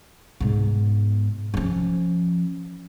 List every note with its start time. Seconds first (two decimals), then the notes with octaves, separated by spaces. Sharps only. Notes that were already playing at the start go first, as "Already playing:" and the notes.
0.40 G#2 B2
1.54 F3 C#4